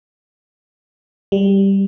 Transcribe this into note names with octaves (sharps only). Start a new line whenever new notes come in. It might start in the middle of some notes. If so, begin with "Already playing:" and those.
G3